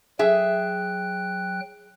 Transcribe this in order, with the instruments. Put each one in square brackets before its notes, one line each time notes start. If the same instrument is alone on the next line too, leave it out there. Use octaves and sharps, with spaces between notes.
[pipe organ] F#3 G5 F#6 [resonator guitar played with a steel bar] G#4 E5